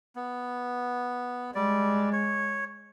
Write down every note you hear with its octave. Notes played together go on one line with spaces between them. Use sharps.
B3
G3 G#3 D5
C#5